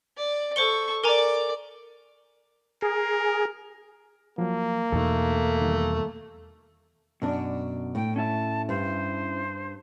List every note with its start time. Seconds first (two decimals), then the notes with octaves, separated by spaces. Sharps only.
0.17 D5
0.56 A4 C5 C#6 C#7 G7
1.04 A#4 D5 G#5 A#5 D6
2.82 G#4 A#4
4.38 F3 F#3 A#3
4.92 E2 B2 A3 D#4 A4
5.61 D#3 G3
7.22 F#2 B2 D4 D5
7.95 A2 G5
8.16 C#4 E4 E5 A5
8.69 G2 C5